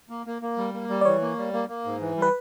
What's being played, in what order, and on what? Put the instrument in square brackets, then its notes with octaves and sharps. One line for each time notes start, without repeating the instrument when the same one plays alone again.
[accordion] A#3
A#3
A#3
G3
A#3
G3
[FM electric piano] D5
[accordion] E3 [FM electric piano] C#5
[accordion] A#3
G3
A#3
A#3
G#2
E3
G3
[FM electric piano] B4